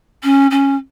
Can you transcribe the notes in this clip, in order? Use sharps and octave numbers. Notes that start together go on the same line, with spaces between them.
C#4
C#4